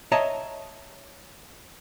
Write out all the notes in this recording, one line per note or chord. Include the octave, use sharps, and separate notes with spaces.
C#5 D#5 E5 A5 A#5